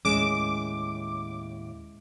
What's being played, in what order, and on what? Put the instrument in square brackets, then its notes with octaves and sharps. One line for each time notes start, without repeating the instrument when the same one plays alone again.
[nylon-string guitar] D#2 A2 C#4 [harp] G#3 E7 [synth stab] D6